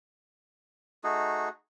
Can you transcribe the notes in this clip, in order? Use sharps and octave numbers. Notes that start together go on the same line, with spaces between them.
A3 D#4 F#4 G#4